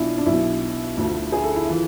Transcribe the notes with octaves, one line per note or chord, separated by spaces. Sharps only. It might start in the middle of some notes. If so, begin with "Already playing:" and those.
Already playing: B1 B2 D4 E4 F4
D4
B1 B2 E4
D2 D3 F3
G#4
A4
E4
E3 F4